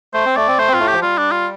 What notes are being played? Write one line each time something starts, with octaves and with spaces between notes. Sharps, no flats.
A3 C5
C4
A3 D5
C4
A3 C5
C4
F4
A2 A3
F3 G4
G3 F4
D4
F4